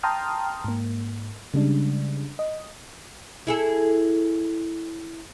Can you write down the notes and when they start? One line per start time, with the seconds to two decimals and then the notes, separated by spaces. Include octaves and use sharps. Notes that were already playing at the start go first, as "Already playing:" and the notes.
0.03 G5 A5 A#5 C6 D#6 F6
0.64 G#2 A#3
1.54 C#3 G3 G#3 D4
2.39 D#5
3.47 E4 G#4 A4